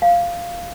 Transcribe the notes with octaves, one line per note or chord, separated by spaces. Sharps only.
F5